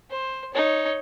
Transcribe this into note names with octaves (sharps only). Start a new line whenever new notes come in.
C5
D#4 C#5